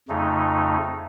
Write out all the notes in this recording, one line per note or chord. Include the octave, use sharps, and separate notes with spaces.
F2 C#3 A3 D#4